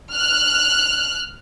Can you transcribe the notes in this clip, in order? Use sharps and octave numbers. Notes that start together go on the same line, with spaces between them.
F6 F#6